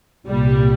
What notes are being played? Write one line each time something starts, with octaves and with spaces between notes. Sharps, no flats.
C2 A#2 G3